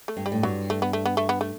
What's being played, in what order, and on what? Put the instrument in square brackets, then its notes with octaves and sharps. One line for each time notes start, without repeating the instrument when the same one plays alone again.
[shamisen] A3
[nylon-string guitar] G2
[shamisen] G3
[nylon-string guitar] A2
[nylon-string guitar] G2 [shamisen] F#3
[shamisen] A3
B3
A3
B3
A3
B3
A3